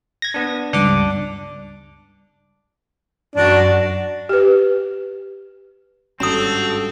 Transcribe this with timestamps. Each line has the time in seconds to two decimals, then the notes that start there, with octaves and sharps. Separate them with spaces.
0.22 G#6 A#6
0.34 B3 D4
0.73 C#2 G2 D4 D6
3.36 F#2 D4 F#4
4.29 G4 B4
6.20 G#1 G2 C4 C#4 F#4 A4 A#5 D#6